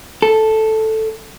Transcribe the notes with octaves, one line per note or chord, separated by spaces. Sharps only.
A4